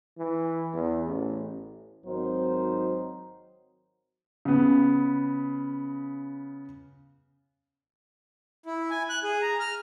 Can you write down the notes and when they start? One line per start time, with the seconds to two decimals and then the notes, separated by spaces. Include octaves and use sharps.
0.18 E3
0.74 E2
1.06 A1
2.05 G#1 F#3 C4 D#4 A#4 C5
4.45 C#3 B3
8.66 E4
8.90 G#5
9.09 F#6
9.23 G#4
9.42 A#5
9.60 F6